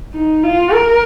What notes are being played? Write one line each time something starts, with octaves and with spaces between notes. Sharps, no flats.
D#4
F4
A#4